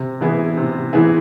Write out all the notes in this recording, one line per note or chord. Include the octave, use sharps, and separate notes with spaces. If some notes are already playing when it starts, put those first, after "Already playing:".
Already playing: C3
E3 B3 E4 G#4
C3
E3 B3 E4 G#4